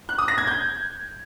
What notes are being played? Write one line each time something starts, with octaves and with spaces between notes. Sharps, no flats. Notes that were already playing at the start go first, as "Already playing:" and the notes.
F#6
D#6
A#6
G#6
G6